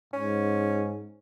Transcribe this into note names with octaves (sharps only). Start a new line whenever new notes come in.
G#2 C#4